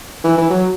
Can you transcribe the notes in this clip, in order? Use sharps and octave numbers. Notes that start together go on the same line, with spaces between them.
E3
E3
F#3